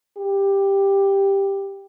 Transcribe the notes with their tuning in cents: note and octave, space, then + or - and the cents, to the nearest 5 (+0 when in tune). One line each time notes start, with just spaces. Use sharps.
G4 +5